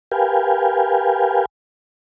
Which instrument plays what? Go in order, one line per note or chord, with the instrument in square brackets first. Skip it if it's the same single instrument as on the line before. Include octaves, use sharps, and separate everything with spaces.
[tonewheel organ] G4 A#4 B4 F5 G5 G#5